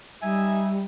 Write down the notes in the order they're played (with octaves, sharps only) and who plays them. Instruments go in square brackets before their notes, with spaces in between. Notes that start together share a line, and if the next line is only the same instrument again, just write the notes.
[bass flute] G3 [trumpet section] D#4 E5 G#5